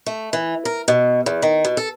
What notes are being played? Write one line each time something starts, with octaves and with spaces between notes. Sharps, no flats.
A3
E3
A#4
B2
E2
D#3
B2
A4